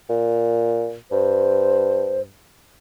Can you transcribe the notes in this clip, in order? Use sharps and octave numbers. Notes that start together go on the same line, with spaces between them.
A#2
G2 C5